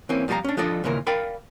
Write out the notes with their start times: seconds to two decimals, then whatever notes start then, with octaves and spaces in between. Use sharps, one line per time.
0.09 E3 A#3 C4 C#4
0.28 F2 G3 F4 F#4 F5 A#5
0.44 C#4 D4
0.57 F3 D4 F4 A4 D5 D#5
0.84 D#2 A#2 C#3 E3 A#4
1.07 A#4 D5 F5 G5 B5